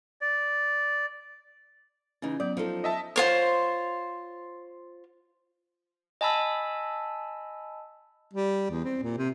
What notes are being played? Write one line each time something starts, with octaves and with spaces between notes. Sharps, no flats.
D5
C#3 E3 C#4 D#4
F#3 B3 D5
F3 D#4 A4
D#5 E5 A5
F4 C5 C#5
D#5 G#5 A5 B5 E6
G3
E2
C4
A#2
C3